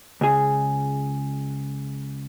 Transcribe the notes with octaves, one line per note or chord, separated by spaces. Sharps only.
C#2 G#4